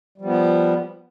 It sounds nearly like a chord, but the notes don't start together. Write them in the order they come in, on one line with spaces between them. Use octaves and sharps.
G3 F3 B3